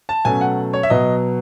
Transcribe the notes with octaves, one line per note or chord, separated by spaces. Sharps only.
A5
B2 F#3 A3 C#4 G#5
F#5
C#5
E5
B2 F#3 B3 D#5